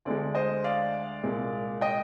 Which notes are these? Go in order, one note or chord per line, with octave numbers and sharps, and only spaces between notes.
D2 D3 G#3 D5
C5 D#5
D5 F5
C2 A#2 G#3
D#5 G5